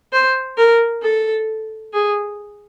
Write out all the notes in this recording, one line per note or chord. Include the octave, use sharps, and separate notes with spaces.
C5
A#4
A4
G#4